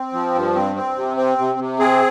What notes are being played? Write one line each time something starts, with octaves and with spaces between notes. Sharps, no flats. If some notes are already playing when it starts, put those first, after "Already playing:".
Already playing: C4
F3
G2
C4
C4
C3
C4
C3
C3
C4 G#4